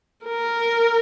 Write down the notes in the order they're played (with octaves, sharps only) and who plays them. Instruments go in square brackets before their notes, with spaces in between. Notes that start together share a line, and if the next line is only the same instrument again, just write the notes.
[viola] A#4